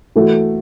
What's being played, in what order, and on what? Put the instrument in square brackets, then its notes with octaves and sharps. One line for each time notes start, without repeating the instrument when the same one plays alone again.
[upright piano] E3 A3 F#4